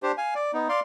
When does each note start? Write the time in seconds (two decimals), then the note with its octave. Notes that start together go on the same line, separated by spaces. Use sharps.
0.03 D4 G4 C5
0.18 F5 G#5
0.35 D5
0.53 B3 D#4
0.69 D5 F5 C6